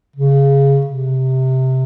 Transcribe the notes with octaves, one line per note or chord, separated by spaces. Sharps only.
C#3
C3